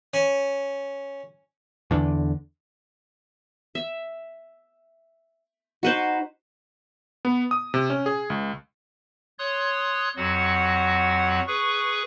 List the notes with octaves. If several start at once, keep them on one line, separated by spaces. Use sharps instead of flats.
C#4
E2 D3
E5
D#4 F#4 B4 C5
B3
D#6
C3
C#4
G#4
C#2
C#5 C6 D#6 F#6
F2 F#3 F#4 F#5
G#4 B4 C#6